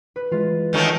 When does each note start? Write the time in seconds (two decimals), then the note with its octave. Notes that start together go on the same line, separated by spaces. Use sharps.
0.16 B4
0.32 E3 G#3 F4
0.73 F#2 D#3 A3 A4 C#5